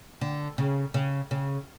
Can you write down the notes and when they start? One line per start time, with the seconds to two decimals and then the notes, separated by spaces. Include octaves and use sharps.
0.21 D3
0.58 C#3
0.94 C#3
1.31 C#3